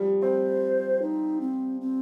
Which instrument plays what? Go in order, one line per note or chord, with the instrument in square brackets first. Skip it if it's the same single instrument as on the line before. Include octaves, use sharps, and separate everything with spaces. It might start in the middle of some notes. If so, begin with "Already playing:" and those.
Already playing: [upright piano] F3 G3
[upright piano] C4 [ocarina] C5
[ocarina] D#4
C4
C4